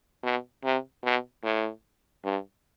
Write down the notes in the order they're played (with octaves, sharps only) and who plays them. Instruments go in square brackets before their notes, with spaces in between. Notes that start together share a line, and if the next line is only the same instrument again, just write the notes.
[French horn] B2
C3
B2
A2
G2